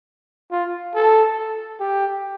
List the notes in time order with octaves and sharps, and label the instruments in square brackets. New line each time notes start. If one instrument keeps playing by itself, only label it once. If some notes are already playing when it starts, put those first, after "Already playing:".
[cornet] F4
A4
G4